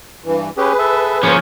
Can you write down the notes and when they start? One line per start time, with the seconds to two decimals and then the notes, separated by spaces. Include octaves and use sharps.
0.24 G2 E3
0.57 C#4 G4 G#4 B4
0.79 A4 E5
1.23 F3 A#3 C#4 G#4 C5 C#5